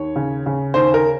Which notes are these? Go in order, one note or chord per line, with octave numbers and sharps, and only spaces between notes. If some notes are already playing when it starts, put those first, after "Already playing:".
Already playing: D#2 C#5
C#3
C#3
D#2 C5
A#4